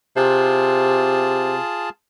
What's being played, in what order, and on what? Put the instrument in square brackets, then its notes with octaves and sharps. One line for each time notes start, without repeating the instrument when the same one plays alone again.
[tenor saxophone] C3 [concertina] F4 G#4 A5